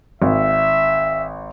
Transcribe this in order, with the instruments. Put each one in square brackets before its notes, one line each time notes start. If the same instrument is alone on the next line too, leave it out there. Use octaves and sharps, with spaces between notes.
[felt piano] G#1 [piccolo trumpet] E5